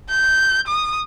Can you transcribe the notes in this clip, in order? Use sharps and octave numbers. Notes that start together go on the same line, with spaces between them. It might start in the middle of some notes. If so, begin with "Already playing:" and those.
G6
D#6